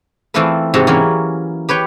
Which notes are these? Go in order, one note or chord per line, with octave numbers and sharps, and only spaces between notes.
E3 A3 C4 F4 A4 B4
G#2 C3 F#4 E5 A5
E3 F#3 A#3 C#4
G4 B4 C#5 G5